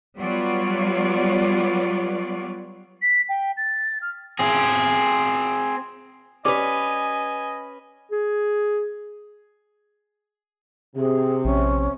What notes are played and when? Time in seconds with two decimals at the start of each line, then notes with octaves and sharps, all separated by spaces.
0.18 F#3 G3 B3 F4 C#5 D5
3.02 B6
3.29 G5
3.57 A6
4.02 F6
4.39 C4 G#4
6.45 C#4 G4 B4 D5 D#5 G#5 D6
8.12 G#4
10.96 C3 G#4
11.45 A#1 C#4